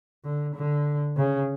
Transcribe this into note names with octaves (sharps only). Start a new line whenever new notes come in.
D3
D3
C#3